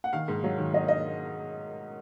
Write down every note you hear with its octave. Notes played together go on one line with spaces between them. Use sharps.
F#5
D#3 F5
G#2
F#3
D#3
F#3 D#5
D#5